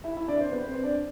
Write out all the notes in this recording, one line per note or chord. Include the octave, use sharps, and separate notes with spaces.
E4 E5
E4 E5
D4 D5
C4 C5
B3 B4
C4 C5
D4 D5